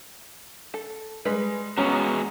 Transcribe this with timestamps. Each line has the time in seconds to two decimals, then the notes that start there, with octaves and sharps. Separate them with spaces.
0.74 A4
1.25 G3 G#3 B4
1.78 G#3 B3 C#4 F#4 A#5